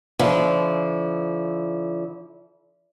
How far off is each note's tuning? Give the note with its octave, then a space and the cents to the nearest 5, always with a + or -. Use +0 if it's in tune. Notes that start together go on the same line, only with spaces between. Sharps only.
D3 -40 F3 -40 E4 -30